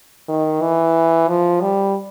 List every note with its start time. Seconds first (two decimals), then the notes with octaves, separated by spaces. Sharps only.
0.28 D#3
0.62 E3
1.28 F3
1.61 G3